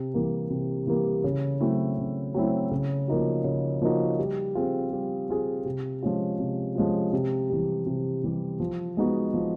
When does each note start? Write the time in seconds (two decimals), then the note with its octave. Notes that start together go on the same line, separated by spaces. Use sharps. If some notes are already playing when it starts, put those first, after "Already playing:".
Already playing: C3
0.14 E3 G3 A#3
0.50 C3
0.87 E3 G3 A#3
1.24 C#3
1.61 F#3 A3 C4 E4
1.98 C#3
2.34 F#3 A3 C4 E4
2.71 C#3
3.08 F3 A#3 D#4 F#4
3.44 C#3
3.82 F3 A#3 D#4 F#4
4.18 G3
4.55 C4 F4 G#4
4.92 G3
5.29 C4 F4 G#4
5.65 C3
6.03 F3 G#3 C#4 F4
6.39 C3
6.75 F3 G#3 C#4 F4
7.13 C3
7.50 E3 G3
7.86 C3
8.24 E3 G3
8.60 F3
8.97 G#3 B3 D#4 F#4
9.34 F3